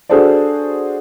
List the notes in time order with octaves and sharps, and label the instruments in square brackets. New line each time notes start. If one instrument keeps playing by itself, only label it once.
[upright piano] D4 F#4 G#4 A4 C5 D5